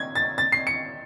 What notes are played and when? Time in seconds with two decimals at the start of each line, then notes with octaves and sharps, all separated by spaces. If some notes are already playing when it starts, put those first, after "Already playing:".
Already playing: G#6
0.15 A6
0.38 A6
0.52 C7
0.67 C#7